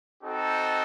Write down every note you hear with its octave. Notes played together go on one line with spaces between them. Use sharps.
C4 D#4 F#4 A4